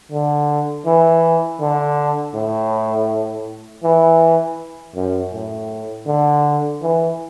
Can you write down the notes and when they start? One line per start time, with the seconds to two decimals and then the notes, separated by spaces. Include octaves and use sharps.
0.12 D3
0.86 E3
1.61 D3
2.35 A2
3.84 E3
4.95 F#2
5.33 A2
6.07 D3
6.82 E3